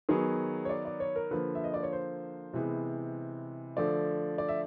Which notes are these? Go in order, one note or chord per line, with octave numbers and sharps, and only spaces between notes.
D#3 F#3 B3 G#4
C#5
D5
D5
C#5
A#4
D3 F3 A#3 B4
E5
D#5
D5
C#5
C5
C3 E3 G#3 B3
D3 F3 A3 D5
D5
E5